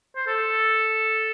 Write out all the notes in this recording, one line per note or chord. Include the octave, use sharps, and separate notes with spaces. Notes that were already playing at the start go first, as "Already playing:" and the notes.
C5
A4